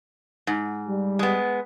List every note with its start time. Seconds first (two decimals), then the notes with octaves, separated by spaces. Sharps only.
0.47 G#2
0.88 G3
1.19 G#3 B3